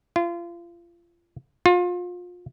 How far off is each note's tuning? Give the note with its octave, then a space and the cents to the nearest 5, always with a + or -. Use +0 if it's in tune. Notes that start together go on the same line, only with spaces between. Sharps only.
F4 -30
F4 +30